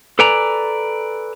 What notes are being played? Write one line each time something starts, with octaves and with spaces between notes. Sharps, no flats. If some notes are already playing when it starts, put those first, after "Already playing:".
A4 B4 D5 G#5 A#5